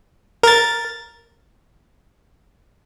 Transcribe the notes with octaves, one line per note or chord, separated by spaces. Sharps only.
A#4 A6